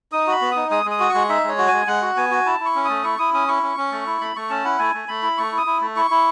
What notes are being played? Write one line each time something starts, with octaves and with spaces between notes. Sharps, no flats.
D#4 D#6
F#4 B5
B3
D#4 D#6
G#3 D#6
G#3
D#6
F#4
G#3 C#6
D#4 E5
G#3 C#5
F#4
G#3 G#5
G#3 F#5
F#4
B3 G#5
F#4
E4 A5
E4
C#6
C#4
A3 D#6
E4 C#6
E4 D#6
C#4 D#6
E4 C#6
C#4
C#4
A3
E4
A3 B5
A3 C#6
C#4 A5
E4 F#5
A3 G#5
A3
A3 B5
E4
A3 C#6
E4
D#6
E4
A3
E4 C#6
E4